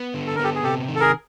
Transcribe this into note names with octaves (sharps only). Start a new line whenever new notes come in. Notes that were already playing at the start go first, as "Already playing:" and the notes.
Already playing: B3
D3
A4
A#4
B3 G4 A4
G#4
C3 G4 A4
D#3
A4
G#4 A#4